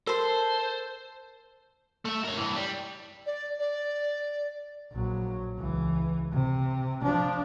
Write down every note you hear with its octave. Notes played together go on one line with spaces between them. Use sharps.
A4 A#4 C5 C6
A3 E5
A#4 C#5
G2 E3
G3
D5
D5
A#1 F#3
C#2 E3
C3
F3 D4